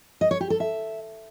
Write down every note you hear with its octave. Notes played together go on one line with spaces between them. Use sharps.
D#5
C#5
G4
A4
E5